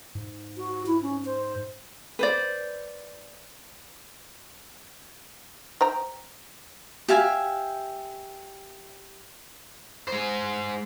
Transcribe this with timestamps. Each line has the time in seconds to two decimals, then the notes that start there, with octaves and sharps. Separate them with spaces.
0.15 G#2
0.57 F#4
0.86 E4
1.02 C#4
1.25 C5
2.19 B4 C5 D5
5.81 C5 G5 A#5
7.08 G4 E5 F5 G#5
10.08 G#3 C5